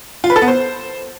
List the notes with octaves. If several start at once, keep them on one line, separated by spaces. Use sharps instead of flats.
F4
B4
A4
B3
C5